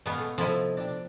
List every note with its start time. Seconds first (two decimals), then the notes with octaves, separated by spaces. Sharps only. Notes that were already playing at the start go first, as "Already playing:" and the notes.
0.06 B2 G#3 B3 F5
0.19 A3
0.38 C3 F3 E4 A4 D#5
0.77 C3 D4